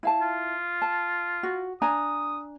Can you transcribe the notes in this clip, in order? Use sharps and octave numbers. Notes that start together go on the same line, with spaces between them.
E4 F5 A5
F4
A5
F#4
D4 G#5 A#5 D#6